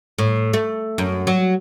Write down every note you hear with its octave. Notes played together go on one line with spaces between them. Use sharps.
A2
A3
F#2
F#3